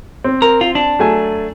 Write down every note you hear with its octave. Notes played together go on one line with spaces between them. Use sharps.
C4
A#4
F4
D4
F#3 A3 G#5